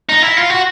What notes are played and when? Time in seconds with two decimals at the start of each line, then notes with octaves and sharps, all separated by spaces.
0.09 D#4
0.22 E4
0.37 F4
0.50 F#4